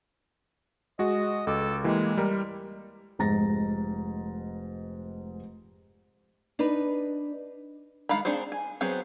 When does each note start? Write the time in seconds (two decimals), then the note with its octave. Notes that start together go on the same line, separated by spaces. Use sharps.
0.99 G#3 F#4 D#5
1.47 C#2 A4 D6
1.84 E3 G#3 A#3 G4
2.17 G3 A#4
3.19 F1 G#2 A#5 A6 A#6
6.59 D4 D#4 B4
8.09 D#3 G#3 F5 A#5 B5
8.25 C4 D4 D#4 G#4 C5
8.52 G#5
8.81 F#3 B3 C4 G#4 C5